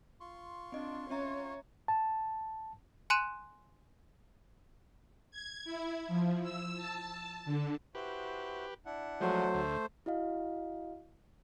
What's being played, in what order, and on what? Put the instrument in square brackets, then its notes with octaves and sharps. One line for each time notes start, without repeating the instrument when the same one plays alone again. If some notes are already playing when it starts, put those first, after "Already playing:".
[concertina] F4 C6 C#6
[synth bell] C4 D#5 [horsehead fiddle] D4
[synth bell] C#4 E5 A#5 [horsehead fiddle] C#5
[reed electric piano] A5
[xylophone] G#5 C6 F#6 D#7 E7
[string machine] G#6
E4
F3
E6
A5
D3
[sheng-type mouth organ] E4 F#4 C5 [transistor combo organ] G4 B4
[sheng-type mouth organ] D4 E4 F#5
[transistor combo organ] F3 G#3 [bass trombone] F#3 [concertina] A3 C5
[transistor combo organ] D2
[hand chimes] E4 F#4 D#5 F5